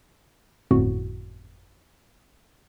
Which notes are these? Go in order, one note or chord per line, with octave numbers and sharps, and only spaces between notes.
G1 F2 A2 F#4